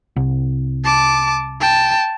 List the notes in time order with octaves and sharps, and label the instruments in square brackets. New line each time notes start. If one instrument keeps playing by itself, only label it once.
[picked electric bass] C2
[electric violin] A5 D6
G5 A5